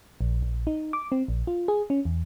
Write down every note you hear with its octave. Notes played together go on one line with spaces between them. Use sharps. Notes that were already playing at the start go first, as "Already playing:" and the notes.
A#1
A#1
D#4
D6
C4
A#1
F4
G#4
C#4
E2